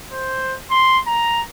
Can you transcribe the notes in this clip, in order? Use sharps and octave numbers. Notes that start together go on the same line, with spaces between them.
C5
C6
A#5